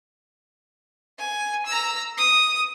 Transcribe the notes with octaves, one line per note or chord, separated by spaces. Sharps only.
G#5
A#5 E6
D#6